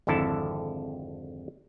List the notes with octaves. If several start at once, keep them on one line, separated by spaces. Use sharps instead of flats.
G#1 F2 D3 E4 A4 A5